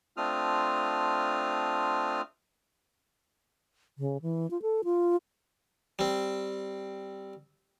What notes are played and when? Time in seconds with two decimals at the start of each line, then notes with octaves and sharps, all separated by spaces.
0.17 A3 C4 D4 F4 D#6 F6
3.98 C#3
4.22 E3
4.51 F4
4.62 A4
4.84 F4
5.99 G3 C4